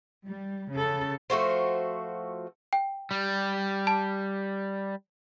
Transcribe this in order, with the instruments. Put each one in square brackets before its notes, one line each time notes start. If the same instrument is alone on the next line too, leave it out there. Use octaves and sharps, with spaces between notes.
[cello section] G3
C#3 A4
[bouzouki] F3 A3 F#4 C5
[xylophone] G5
[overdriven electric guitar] G3
[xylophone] A5